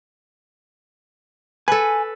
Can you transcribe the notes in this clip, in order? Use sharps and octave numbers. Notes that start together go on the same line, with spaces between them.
A4 B4 G#5